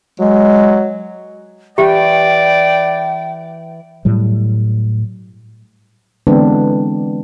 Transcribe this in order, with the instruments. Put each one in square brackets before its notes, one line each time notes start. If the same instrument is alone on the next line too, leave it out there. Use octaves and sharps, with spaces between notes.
[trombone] F#3 [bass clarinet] G#3
[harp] E3 [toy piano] G4 [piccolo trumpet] D5 [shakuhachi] G5
[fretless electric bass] A2 F#3 G3
[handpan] D3 E3 G#3 B3 C4 D4